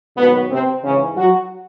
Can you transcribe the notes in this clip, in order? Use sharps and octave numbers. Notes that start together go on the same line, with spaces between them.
G#2 B2 D#3 F#3 B3
C3 C4
G#2 C#3 E3 C#4
F#3 F#4